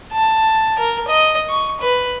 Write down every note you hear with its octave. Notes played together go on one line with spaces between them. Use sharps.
A5
A#4
D#5
C#6
B4